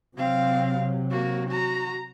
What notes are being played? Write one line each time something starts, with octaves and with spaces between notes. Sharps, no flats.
C3 F#3 C4 F5
A#3 F#4
F#4 A#5